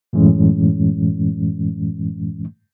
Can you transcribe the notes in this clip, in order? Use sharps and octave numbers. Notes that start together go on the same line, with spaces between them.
F#2 A2 E3 G#3 C#4